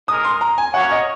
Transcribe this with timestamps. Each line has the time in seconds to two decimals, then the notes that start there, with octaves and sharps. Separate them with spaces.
0.08 G#3 D#4 A#4 D#6
0.24 C6
0.41 A#5
0.58 G#5
0.74 A#3 C#4 F#4 C#5 F#5
0.91 D#5